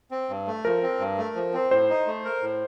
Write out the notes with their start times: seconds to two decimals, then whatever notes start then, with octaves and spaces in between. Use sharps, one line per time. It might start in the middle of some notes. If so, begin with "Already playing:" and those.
0.11 C4
0.29 G2
0.47 A3
0.65 F3 A#4
0.83 C4
1.00 G2
1.18 A3
1.35 F3
1.54 C4
1.71 A2 C5
1.90 D#4
2.07 A3
2.24 A#4
2.42 A2